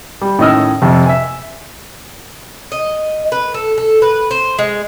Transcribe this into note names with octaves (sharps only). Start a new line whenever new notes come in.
G3
A2 D#3 C#4 D#5 E6 F6
F2 C3 F3
E5 G#5
D#5
B4
A4
A4
B4
C5
G#3